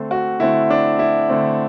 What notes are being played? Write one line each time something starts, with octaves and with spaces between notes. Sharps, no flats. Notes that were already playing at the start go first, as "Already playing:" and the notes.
Already playing: D3 A3 C4
F#4
D3 A3 C4 E4
D4
E4
D3 A3 C4